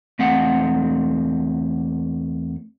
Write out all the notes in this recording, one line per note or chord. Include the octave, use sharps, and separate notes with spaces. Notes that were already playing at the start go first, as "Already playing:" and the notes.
E2 A3 C4 F#5